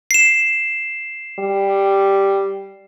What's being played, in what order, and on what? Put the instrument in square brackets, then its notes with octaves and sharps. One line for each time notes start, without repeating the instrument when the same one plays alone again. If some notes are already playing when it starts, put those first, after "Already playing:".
[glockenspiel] C7 E7
[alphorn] G3